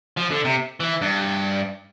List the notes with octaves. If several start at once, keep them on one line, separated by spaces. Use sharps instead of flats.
F3
D3
C3
E3
G2